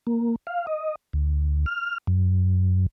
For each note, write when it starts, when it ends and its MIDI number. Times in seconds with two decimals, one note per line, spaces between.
0.07 0.36 58
0.47 0.66 77
0.67 0.95 75
1.13 1.66 38
1.66 1.98 89
2.07 2.86 42